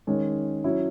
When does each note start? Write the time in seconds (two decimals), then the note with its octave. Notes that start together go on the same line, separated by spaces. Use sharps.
0.07 D#3 G#3 C#4
0.64 F#3 C#4 E4